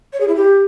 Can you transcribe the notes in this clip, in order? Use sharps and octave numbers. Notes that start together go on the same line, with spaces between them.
C#5
G#4
E4
G4